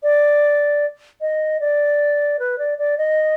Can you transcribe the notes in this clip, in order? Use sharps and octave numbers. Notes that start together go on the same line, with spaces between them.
D5
D#5
D5
B4
D5
D5
D#5